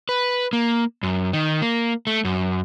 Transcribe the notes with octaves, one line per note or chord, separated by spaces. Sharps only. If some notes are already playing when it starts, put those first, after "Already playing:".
B4
A#3
F#2
D#3
A#3
A3
F#2